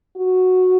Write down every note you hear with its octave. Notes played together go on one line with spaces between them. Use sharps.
F#4